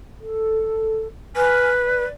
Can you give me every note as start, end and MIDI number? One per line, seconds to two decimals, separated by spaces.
0.19 1.07 69
1.36 2.05 71
1.36 1.69 80
1.36 1.69 89
1.84 2.12 74